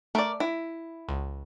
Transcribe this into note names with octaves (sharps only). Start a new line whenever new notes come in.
A3 A#4 D5
E4
C#2